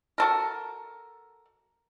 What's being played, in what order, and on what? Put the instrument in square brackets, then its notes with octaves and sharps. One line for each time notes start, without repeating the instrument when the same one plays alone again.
[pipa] F#4 A4 A#4